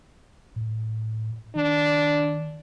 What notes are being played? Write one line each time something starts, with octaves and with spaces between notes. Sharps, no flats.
A2
D#3 D4